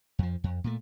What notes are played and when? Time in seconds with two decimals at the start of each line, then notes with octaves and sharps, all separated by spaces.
0.19 F2 F3
0.44 F2
0.64 A#2 A3